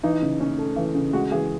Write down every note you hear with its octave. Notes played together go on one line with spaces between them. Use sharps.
E3 D#4
C#3
C#4
A3
E3
C#3
G#3 F#4
E3 G#4